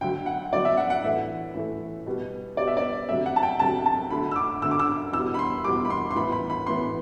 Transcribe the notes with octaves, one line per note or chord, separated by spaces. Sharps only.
D2 D3 F#3 G5
F#5
D2 D3 F#3 D5
E5
F#5
F#5
A2 E3 A3 E5
A2 E3 A3
B2 G3 B3
B2 G3 B3 D5
E5
D5
D2 C3 F#3 A3 E5
F#5
A5
G5
D2 C3 F#3 A3 A5
A5
D2 D3 A3 B5
E6
D6
D2 D3 A3 E6
D6
E6
E2 B2 G3 E6
B5
C6
E2 B2 G3 D6
B5
C6
C6
A2 E3 B3 B5
B5
B5
A2 E3 B3 C6